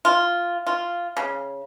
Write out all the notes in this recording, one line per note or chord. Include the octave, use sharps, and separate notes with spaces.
F4
F4
C#3